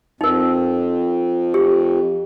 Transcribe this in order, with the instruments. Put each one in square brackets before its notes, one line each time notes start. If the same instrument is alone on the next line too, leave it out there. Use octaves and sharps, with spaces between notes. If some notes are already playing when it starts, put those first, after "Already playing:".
[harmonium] F2 [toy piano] D#4 A#4
[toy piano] G4